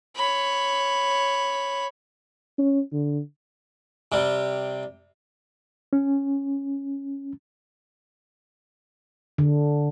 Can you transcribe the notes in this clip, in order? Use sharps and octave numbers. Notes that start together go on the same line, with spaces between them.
C#5 B5
C#4
D3
C3 G3
C#4
D3